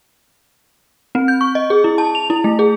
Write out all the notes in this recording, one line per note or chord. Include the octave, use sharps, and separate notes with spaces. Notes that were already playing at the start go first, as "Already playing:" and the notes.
C4
G6
C#6
D#5
G#4
E4
A5
F7
E4
A3
G#4